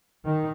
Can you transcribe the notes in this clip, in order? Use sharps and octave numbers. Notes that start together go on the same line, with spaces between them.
D#3